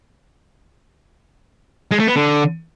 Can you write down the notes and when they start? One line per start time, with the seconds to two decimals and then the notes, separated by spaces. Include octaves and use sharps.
1.91 G#3
1.99 A3
2.08 B3
2.16 D3